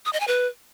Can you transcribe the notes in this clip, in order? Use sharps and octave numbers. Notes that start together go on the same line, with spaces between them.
D#6
D#5
G#5
B4